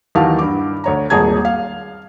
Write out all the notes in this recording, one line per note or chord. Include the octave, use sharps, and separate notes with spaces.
D#2 E3 F#3 G4 F5 A5
G2 D6
D2 C#5 A#5
D#1 G#1 G#4 A5 A#5 G#6
F5